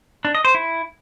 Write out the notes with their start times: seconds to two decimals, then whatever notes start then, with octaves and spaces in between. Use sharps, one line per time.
0.25 D4
0.35 D#5
0.45 C5
0.55 E4